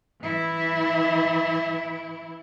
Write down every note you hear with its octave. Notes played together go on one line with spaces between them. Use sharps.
E3 E4